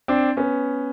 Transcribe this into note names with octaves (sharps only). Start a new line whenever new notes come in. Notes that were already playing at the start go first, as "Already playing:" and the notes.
C4 D4
B3 C#4